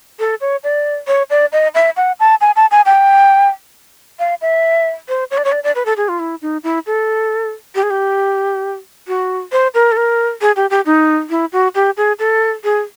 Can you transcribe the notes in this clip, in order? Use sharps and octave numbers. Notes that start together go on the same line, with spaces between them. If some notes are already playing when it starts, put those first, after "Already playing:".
A4
C#5
D5
C#5
D5
D#5
E5
F#5
A5
G#5
A5
G#5
G5
F5
E5
C5
C#5
D5
C#5
D5
D5
B4
A4
G#4
F4
E4
D#4
E4
A4
G4
G#4
G4
F#4
C5
A#4
A4
A#4
G#4
G4
G4
D#4
E4
F#4
G4
G#4
A4
G#4